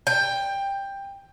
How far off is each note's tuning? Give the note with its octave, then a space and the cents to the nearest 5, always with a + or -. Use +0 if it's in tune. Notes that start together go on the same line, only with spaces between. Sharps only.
G5 +15